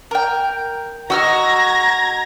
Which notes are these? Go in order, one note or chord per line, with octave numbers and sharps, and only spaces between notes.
A#4 G5
F#4 D#5 A#5 E6 F6 G#6 A#6